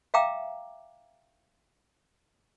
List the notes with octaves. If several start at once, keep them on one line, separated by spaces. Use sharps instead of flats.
E5 F5 G5 A#5 D6 E6